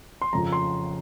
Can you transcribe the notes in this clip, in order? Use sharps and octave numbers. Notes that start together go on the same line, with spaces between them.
C6
F2 C#3 F3 A#5
C6